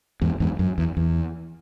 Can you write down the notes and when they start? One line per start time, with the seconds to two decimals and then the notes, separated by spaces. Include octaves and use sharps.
0.22 E2 G#2
0.40 E2 G#2
0.59 F#2
0.78 E2
0.97 E2